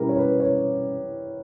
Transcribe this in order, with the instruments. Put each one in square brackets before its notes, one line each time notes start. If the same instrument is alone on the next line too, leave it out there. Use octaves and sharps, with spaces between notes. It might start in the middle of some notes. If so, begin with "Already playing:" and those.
Already playing: [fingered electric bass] B2 G3 C#4 [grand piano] E4 G4 A#4
[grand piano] C#5
B4
C#5